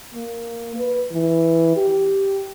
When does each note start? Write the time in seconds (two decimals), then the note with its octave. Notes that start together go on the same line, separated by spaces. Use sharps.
0.14 A#3
0.76 B4
1.12 E3
1.76 G4